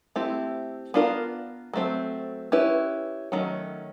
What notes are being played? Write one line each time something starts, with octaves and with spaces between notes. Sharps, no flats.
A3 C4 E4 G4
B3 D4 F4 A#4
F#3 A3 C4
C#4 E4 G4 B4
D#3 F#3 A3 C#4